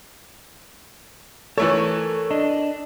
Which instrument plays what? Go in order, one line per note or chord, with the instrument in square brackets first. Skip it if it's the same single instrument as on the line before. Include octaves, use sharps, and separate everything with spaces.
[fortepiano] E3 A3 C#5 [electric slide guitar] A4 A#4
[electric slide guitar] D4 D#5